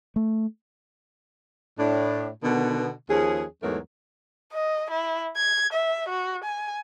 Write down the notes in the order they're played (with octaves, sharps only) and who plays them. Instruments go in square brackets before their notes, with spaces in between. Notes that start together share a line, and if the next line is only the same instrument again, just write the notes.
[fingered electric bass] A3
[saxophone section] A2 D4
B2 D3 D#3 B3
D#2 F3 C#4 G#4
E2 G#2 F#3 A3 B3 A#4
[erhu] D#5
E4
G#6
E5
F#4
G#5